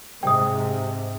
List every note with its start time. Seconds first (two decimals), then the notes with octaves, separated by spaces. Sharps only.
0.23 G#2 C3 G5 D#6